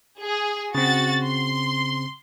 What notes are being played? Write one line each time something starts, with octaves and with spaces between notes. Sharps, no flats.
G#4
C#3 C4 F#4 A6
C6